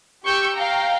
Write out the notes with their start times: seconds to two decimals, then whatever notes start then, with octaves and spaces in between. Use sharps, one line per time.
0.24 G4 C#6 E6 G6 C#7
0.56 F5 G5 A#5